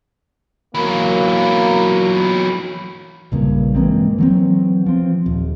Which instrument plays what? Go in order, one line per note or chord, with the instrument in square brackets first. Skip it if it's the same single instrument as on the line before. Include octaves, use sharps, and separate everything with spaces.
[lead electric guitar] E3 F#3 [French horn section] A#3
[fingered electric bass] A#1 G2 C#3 A#3
E3 G#3 A#3 C4
E3 F#3 C4
F3 C4
D#1